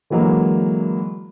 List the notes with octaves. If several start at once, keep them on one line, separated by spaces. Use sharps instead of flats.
D3 E3 F#3 G#3 A#3